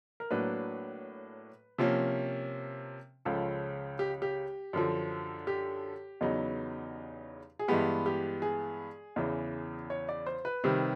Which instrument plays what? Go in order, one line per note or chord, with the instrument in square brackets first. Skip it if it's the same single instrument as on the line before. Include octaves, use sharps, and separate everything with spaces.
[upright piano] A#4
A2 F#3 A#3 D4 B4
C3 F3 A#3 C#4
C#2 C#3 F3 G#3 C#4 A4
G4
G4
F#2 D3 F3
G4
E2 C#3 F#3 B3 D#4
G#4
G2 E3 G#3 B3 G4
G4
G#4
E2 C#3 E3
C#5
D5
C5
B4
C3 D#3 G3 C4